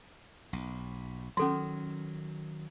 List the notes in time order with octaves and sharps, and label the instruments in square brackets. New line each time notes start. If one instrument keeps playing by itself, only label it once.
[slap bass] B1
[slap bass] D#3 F#3 [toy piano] C#4 A4 C6